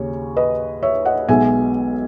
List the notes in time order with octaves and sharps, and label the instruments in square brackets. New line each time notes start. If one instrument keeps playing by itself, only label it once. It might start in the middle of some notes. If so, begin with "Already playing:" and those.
Already playing: [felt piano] D#2 C#3 C#5
B4 D#5
C#5 E5
D#5 F#5
B1 B2 G#3 E5 G#5